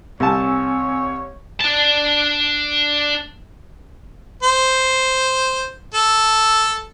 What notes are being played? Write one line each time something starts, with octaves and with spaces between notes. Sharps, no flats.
C2 C4 C#5 G#5 A5 E6
D4 A5
C5
A4